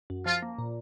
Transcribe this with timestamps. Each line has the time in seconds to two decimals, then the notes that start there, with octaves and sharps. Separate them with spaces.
0.10 F#2
0.26 F3 F4
0.42 A#3
0.58 A#2